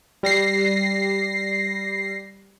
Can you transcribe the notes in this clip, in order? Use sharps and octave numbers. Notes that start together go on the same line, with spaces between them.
G3 A#6 C7